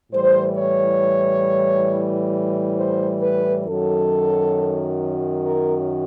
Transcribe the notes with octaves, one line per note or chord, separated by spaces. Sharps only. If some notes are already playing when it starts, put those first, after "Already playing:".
A2 E3 G3 C5
C#5
C5
B4
F#2 D#3 F#3 A4
A#4